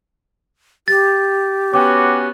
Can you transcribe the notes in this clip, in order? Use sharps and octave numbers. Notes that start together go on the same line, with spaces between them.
G4 A6
B3 C#4 F#4 G5 D6